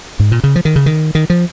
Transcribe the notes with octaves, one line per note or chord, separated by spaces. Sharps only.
G#2
A#2
C#3
F3
D#3
C#3
D#3
D#3
F3